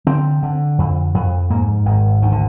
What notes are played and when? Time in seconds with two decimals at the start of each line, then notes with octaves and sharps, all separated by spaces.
0.07 D3 C4
0.43 D3
0.78 F2
1.14 F2
1.50 G#2 A#3
1.85 G#1 D#3
2.22 D2 D#3
2.32 D3